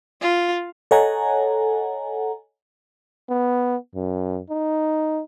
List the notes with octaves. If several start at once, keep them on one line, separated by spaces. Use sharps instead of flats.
F4
A4 C#5 D#5 F#5 G#5 A#5
B3
F#2
D#4